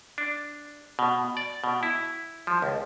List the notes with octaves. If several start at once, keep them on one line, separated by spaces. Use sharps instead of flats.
D4
B2
D5
B2
E4
F3
C#2